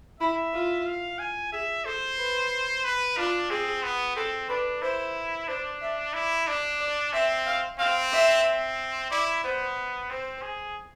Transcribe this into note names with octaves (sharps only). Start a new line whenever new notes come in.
E4 E5
F4
F5
G#5
G#4 E5
A4 C5
B4
B4
D4 F4
C4 G#4
B3
C4 A4
D4 B4
E4 C5
D4 C5
E5
E4 D5
D4 D5
D5
C4 E5
F5
C4 F5
E5
C4
E4 D5
B3 C5
C4 C5
G#4